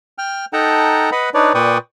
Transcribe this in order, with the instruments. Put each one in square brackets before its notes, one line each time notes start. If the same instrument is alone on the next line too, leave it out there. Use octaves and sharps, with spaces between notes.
[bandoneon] G5 F6
D#4 A4 F#5 G5 A5 A#5
B4 D#5 F#5 B5
D4 D#4 B4 C#5 D5
A#2 B4 D5 G5 C#6 D#6